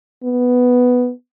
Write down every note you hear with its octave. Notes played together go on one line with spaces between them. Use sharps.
B3